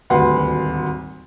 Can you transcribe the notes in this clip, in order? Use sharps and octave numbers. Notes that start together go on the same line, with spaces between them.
D#1 G#1 D2 B4 F#5 C6